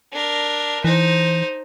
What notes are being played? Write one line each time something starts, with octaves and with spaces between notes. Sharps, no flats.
D4 A#4
E3 D#4 C5